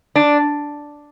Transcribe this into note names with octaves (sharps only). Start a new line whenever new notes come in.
D4